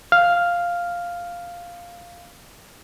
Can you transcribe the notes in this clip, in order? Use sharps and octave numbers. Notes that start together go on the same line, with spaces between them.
F5 F6